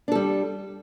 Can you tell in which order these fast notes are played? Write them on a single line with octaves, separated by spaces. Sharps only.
D4 A4 G3